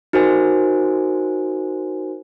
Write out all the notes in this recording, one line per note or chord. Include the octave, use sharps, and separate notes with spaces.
D#4 F#4 A#4 C5 G#5